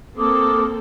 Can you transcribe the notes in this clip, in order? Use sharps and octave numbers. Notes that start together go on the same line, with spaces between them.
A#3 C4 A4 A#4 D6 D#6